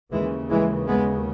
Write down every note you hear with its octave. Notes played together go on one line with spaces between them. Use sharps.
D#2 C#3 E3 G#3
E3 G#3
G#3 B3